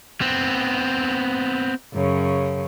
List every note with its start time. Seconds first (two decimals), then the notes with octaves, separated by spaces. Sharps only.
0.21 B3 C4
1.94 F#2 C#3